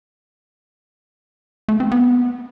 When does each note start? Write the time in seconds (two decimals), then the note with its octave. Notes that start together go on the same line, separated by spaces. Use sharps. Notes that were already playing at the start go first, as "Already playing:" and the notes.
1.68 A3
1.80 C4
1.92 B3